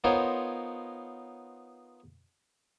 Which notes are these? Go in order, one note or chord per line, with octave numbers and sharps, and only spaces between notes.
B3 D#4 F4 A#4 C5 C#5